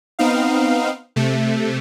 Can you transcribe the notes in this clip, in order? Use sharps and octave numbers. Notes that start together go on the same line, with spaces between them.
B3 C4 D#4 F5
C3 A3